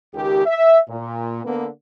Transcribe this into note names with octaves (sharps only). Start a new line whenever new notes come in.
C#2 D#3 G4
E5
A#2
D3 A#3 B3